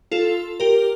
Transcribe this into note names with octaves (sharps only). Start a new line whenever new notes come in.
F4 A4
G4 A#4